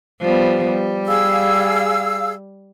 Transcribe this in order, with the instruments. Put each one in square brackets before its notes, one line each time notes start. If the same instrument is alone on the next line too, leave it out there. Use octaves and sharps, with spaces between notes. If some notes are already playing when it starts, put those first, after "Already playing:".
[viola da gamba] F3 G3 B3
G3
[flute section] G#4 F5 E6